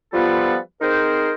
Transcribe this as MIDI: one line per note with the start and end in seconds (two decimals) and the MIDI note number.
0.13 0.57 53
0.13 0.57 55
0.13 0.57 59
0.13 0.57 65
0.13 0.57 69
0.13 0.57 71
0.81 1.33 60
0.81 1.33 63
0.81 1.33 68
0.81 1.33 70
0.81 1.33 72